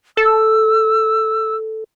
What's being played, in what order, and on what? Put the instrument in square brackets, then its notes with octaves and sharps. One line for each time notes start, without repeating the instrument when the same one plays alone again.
[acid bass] A4 [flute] E6